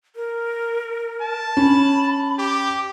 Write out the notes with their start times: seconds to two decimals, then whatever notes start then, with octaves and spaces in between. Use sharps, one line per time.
0.16 A#4
1.21 A5
1.57 C#4 B5
2.38 G4 D6